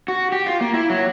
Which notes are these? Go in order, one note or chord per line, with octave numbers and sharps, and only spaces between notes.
F#4
G4
F4
A#3
E4
F#3